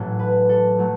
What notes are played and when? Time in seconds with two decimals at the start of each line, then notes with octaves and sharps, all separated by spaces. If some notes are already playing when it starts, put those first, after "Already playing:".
Already playing: A1 A2 F#3 A4
0.19 B4
0.49 A4
0.79 F#3 A3